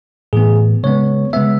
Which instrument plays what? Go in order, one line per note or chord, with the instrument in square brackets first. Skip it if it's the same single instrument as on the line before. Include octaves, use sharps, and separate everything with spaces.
[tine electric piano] A2 E3 B3 G#4
C#3 G#3 B3 C#5
C#3 G#3 B3 E5